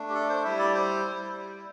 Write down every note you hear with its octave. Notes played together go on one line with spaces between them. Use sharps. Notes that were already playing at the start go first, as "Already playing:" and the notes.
Already playing: A3 D4
G4
A4
C5
G3 E4 E5
D5
C5
E4
G3